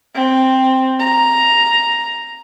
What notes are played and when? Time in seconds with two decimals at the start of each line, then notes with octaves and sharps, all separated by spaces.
0.15 C4
1.00 A#5